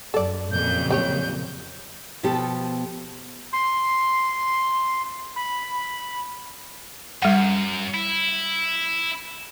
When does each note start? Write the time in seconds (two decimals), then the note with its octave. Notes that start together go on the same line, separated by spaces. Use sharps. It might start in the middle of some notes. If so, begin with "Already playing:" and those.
0.14 F#2 A4 D5
0.51 F2 A#2 C#3 F#3 G6
0.91 G3 G4 C#5 G6
2.23 B2 F3 B3 G4 A4
3.53 C6
5.36 B5
7.22 F#2 G3 F#5
7.94 E4